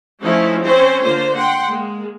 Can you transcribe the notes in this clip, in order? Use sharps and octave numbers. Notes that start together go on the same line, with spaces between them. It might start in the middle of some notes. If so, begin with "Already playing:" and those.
F3 A3 C#4 D#4 E4
C4 C#4 C5 C#5
D3 A#3 F4 C5
F#5 G5 C6
G#3 A#3